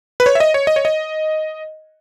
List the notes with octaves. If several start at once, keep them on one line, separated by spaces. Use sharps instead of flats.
B4
C#5
E5
D#5
C#5
D#5
C#5
D#5